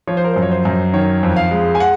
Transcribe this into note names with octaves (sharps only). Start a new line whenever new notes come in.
F3 C#5
C5
A#4
F#2 C5
C#5
C5
F#2
D#3 C#5
F2
F5
G#3
G#5
F#5